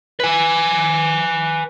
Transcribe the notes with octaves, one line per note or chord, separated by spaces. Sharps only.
B4 G#5